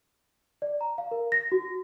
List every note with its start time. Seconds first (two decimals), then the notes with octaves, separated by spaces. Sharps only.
0.62 D5
0.81 A#5
0.98 F5
1.11 A#4
1.32 A#6
1.52 F#4